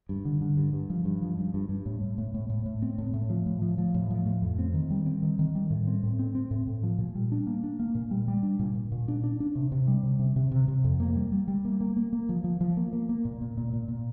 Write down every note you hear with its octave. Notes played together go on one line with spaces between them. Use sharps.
G2
D3
D3
G2
G2
F3
G2
F3
G2
G2
G2
A2
A2
A2
A2
A2
A2
C4
A2
A2
F3
A2
F3
F3
A2
F3
A2
F2
C4
D#3
G3
C4
D#3
D#3
G3
A2
C4
A2
C4
C4
A2
A2
F3
A#2
G3
D4
A#3
D4
A#3
A#2
G3
G3
D4
A#2
A#2
A#2
D4
D4
D4
C3
C3
G3
C3
C3
C3
C3
C3
F2
A#3
G3
G3
G3
A#3
A#3
A#3
A#3
F3
F3
F3
A#3
A#3
A#3
A#2
A#2
A#2
A#2
A#2